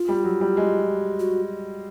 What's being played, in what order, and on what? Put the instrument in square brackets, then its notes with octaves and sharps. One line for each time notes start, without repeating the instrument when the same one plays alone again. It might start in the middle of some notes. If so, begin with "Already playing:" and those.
Already playing: [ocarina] F4
[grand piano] G3
F#3
G3
G#3
[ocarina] F#4